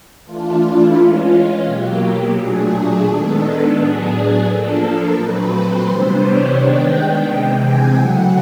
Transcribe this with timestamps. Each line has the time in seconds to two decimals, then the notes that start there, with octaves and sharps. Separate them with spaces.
0.24 E3 A3 D4 F4
0.60 E4
0.95 E3 G#3 C#4 F4
1.64 B2 F#3 A#3 G4
2.34 A#2 F#3 A3 D4 G#4
2.70 G#4
3.04 D#3 G#3 B3 D4 A4
3.74 A2 F#3 B3 D4 G#4
4.44 F3 A#3 D4 A4
4.79 A#4
5.14 A#2 F#3 A3 C4 B4
5.49 C5
5.84 C3 E3 G3 B3 D4
6.19 C#5
6.54 D#3 G#3 B3 D4 G5
6.89 G5
7.24 C3 E3 G#3 C4
7.58 G#5
7.94 C#3 F#3 A3 F#5